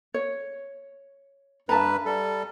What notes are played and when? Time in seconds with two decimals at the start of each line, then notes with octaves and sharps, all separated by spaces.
0.14 C#5
1.69 G2 B4 E5 A5 A#5
2.06 G3 A4